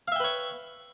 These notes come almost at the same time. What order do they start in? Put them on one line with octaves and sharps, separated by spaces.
F5 E5 G5 B4 C#5